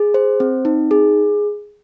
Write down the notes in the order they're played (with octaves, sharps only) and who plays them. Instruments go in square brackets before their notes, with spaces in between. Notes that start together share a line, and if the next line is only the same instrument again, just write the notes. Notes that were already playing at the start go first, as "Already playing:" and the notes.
Already playing: [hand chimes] G#4
C5
C4
D#4
G#4